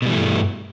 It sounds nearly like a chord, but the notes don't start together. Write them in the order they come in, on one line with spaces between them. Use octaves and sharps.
B2 G3 E3 A3 G2